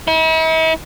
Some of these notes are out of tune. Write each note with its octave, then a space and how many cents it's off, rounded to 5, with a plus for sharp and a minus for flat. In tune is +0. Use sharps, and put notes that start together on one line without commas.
E4 -45